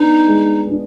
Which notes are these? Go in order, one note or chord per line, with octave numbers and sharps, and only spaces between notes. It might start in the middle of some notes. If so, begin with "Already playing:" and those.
Already playing: B3 D4 D#4
G#3
B3 D4